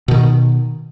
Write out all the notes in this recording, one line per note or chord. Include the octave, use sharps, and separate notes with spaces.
B2 D#3